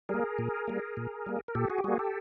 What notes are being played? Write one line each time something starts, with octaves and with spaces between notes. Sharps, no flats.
G3 A#3 G#4 A#4
A#2
G3 A#3
A#2
G3 A#3
A#4
A#2 G4 A4
F#4 G#4
G4
G3 A#3 F#4 G#4
G4 A4